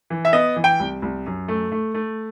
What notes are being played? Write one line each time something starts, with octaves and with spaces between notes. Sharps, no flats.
E3
E5
B3 D#5
E3
G5
C2
C2
F#2
A3
A3
A3